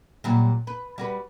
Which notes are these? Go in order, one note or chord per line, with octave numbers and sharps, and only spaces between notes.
A#2 F#3 G3
B4
G3 F#4 B4